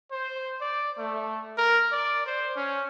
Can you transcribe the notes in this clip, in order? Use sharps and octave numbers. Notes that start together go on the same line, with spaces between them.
C5
D5
A3
A#4
D5
C5
C#4